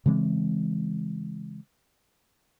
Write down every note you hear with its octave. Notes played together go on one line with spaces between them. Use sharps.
C#3 E3 G#3 C4